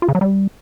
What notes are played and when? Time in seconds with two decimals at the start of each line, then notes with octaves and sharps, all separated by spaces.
0.02 F4
0.08 C#3
0.15 F#3
0.21 G3